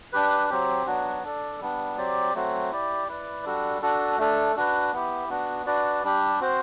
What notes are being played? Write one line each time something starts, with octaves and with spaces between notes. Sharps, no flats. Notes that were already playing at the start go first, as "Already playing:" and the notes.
D4 G4 B4
F#3 C4 G4
F#3 B3 D4 F#4
D4 A4 D5
G3 B3 D4
F#3 C4 G4 D5
F#3 A3 C4 F#4
E4 G4 D5
E4 B4 D5
G3 D4 F#4 A4
D4 F#4 A4
A3 D4 A4
D4 F#4 B4
B3 E4 G4
B3 D4 F#4
D4 F#4 B4 D5
G3 D4 G4
C4 F#4 C5